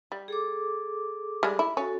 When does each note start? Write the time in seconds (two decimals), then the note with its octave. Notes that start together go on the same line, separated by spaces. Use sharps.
0.12 G3
0.28 G#4 A4 D6
1.43 G3 G#3
1.59 E4
1.77 C#4 F#4 A4